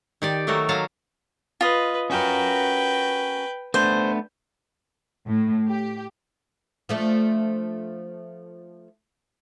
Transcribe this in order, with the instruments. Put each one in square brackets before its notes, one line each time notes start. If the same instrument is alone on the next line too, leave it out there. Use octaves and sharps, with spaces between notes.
[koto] D#3 G4 D5
D#3 F#3 A3 F#4 A#4
F#3 A#3 F5 A5 A#5
[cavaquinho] F4 D#5 [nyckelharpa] B4
[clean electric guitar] C#4 F#4 A#4 [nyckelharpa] B4 G5
[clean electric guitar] A3 B3 D4 [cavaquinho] C5
[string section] A2
G4
[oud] F3 A3 D4